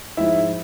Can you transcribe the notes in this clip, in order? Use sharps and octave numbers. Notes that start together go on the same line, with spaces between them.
G#2 F3 E4 E5